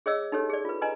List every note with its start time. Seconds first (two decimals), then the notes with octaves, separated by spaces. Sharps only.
0.06 G#4 C#5 D#5 E6
0.32 D#4 G4 A4 C#5
0.50 G#4 D5
0.65 F4 B4
0.81 B4 D#5 G#5 A#5